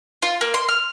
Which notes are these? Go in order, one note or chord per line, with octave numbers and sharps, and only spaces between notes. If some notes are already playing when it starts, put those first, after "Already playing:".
F4
A#3
C6
F6